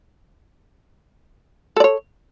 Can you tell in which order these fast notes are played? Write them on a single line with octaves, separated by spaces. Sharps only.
A4 D5 C#5